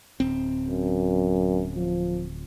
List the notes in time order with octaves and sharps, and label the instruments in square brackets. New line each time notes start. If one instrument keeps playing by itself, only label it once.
[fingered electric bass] D1 C4
[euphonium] F#2
F3